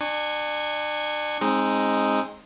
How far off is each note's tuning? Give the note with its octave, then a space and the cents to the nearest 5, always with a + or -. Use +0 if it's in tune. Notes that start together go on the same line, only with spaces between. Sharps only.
D4 +35 G#5 -15 C#6 +0
G#3 +0 C4 +25 D#4 +0